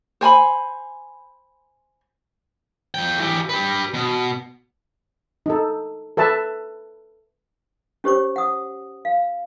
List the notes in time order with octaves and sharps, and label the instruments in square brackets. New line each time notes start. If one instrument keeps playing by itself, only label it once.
[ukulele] C5 G#5 A5 B5
[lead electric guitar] F3 G5
E3 G4
G4 B4
B2
[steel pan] D#4 A4
A4 B4 E5 A5
[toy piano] C#4 G4 C5 C#5 D6
F#5 D#6
F5